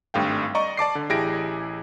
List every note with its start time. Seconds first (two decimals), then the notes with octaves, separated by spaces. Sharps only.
0.14 G#1 G2 A3 F5 G5
0.55 D5 D#5 A#5 C#6
0.77 D5 A5 D6 C7
0.95 D3
1.09 A1 E4 G4 G#4 A#6 D7